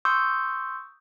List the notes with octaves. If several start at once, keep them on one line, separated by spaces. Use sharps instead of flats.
C6 C#6 D#6 E6 G6